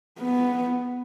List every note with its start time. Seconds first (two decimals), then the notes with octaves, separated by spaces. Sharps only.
0.20 B3